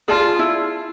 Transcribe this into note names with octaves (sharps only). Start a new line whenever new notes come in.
F4 G#4 D5 A5
E4